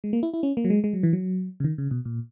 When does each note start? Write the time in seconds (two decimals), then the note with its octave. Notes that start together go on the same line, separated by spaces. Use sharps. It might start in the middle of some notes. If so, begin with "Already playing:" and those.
0.04 G#3
0.13 A#3
0.23 E4
0.34 E4
0.43 C#4
0.57 A#3
0.64 F#3
0.70 G#3
0.84 G#3
0.93 F#3
1.03 E3
1.13 F#3
1.60 C#3
1.64 D#3
1.78 C#3
1.91 B2
2.05 A#2